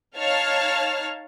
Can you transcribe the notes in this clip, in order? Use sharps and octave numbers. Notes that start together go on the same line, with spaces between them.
D#4 C#5 F5 A5 F6